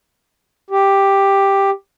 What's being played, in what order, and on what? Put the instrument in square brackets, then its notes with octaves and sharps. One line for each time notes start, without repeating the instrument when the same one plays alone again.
[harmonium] G4